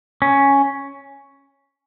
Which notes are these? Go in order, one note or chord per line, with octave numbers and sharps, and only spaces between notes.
C#4